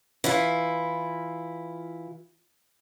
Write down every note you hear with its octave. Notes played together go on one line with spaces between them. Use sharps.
E3 E4 F4